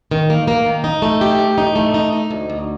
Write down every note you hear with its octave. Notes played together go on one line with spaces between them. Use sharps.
D#3
A#3
A#3
D#3
D#4
A3
G4
A2
D#4
A3
D#4
D#4
D2
D2